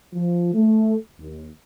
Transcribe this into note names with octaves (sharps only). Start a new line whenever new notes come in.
F3
A3
D#2